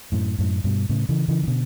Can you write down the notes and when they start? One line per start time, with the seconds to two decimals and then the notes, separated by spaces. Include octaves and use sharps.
0.12 F#2 A2
0.39 F#2 A2
0.64 G2 B2
0.89 A2 C#3
1.09 C#3 E3
1.28 C#3 E3
1.43 E3
1.47 B2 D3